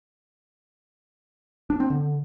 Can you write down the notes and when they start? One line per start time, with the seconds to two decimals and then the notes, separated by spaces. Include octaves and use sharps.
1.70 D4
1.80 C4
1.90 D3